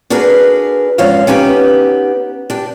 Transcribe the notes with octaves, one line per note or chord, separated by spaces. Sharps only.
D4 F#4 G#4 A#4 B4
E2 G#2 F3 C#4 F#4 F5
B3 C#4 D#4 G4
D4 G4